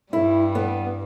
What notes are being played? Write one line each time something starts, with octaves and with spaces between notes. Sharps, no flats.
G2 G3 E4
B3